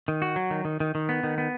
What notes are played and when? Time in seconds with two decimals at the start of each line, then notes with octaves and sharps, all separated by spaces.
0.08 D#3
0.22 F#4
0.36 F#3
0.51 D#3
0.65 D#3
0.80 D#3
0.95 D#3
1.09 B3
1.24 D#3
1.38 B3